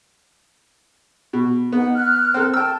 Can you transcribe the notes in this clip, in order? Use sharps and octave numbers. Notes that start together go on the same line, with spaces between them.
B2
B3 D#4 F#5
F6 F#6
C4 A4 A#4
G5 A5 E6 F6